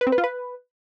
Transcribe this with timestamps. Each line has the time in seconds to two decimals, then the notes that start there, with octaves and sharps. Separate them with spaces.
0.01 B4
0.07 C4
0.12 B4
0.18 F4
0.24 B4